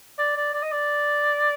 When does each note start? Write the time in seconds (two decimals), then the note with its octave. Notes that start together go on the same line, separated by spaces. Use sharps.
0.18 D5
0.36 D5
0.54 D5
0.63 D#5
0.72 D5